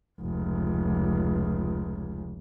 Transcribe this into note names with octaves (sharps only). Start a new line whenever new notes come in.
F1 C#2